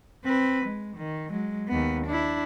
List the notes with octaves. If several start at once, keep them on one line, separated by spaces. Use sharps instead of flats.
C4 B4
G#3
D#3
F#3 G#3
D#2 B3
D4 E4